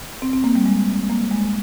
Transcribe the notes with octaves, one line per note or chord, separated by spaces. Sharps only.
C4
C4
A#3
G3
G#3
A#3
G#3